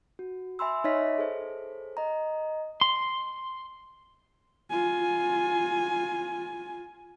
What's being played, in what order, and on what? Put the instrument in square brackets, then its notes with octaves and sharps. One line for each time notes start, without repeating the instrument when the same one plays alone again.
[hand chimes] F#4
E5 G#5 B5 C6 E6
D#4 C#5 D#5 E5 B6
G#4 A4 C5
D#5 A#5
[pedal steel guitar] C6
[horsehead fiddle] F4 G#5